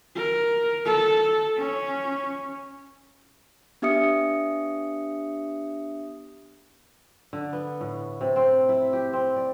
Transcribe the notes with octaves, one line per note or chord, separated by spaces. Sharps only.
A#4
A4
C#4
B3 D4 G4 E5 D#6 C#7
D3
B3
A2
C3
C4
E4
G4
C4
D5